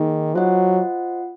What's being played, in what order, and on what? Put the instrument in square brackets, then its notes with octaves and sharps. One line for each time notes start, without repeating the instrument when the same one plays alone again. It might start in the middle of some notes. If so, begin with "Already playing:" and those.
Already playing: [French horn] D#3 [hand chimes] A#3 D#4 G#4
[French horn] F#3 [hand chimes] F4 C5 D#5 F#5